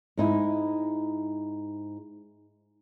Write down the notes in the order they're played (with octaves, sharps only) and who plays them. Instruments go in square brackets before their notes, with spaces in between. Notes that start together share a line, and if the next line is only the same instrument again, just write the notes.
[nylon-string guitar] G#2 D#4 E4